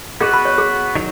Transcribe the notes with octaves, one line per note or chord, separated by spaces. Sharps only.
B3 F#4 G#4 B4
B5
C#5
G#4
D#3 F#3